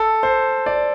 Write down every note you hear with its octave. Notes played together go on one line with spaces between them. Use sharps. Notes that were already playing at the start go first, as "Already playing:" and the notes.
Already playing: A4
C5
D5